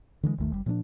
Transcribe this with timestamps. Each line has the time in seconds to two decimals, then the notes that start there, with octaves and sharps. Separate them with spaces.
0.23 D3 E3 G3 G#3
0.38 G1 D#2 D#3 A3
0.51 F#1 G3
0.66 A#2 F3 C#4 D4